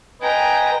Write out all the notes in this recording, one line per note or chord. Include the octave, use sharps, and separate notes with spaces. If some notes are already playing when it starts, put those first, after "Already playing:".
B4 D#5 G5 G#5 A#5